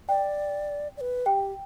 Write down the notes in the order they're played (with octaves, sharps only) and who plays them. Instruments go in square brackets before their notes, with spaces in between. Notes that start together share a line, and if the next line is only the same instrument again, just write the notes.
[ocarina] D5 [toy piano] G5
[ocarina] D5
B4
[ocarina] G4 [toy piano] G5